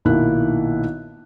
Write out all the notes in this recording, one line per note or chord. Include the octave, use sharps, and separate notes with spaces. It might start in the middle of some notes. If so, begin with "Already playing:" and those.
B1 A#2 D#3 A#3 E4 F#6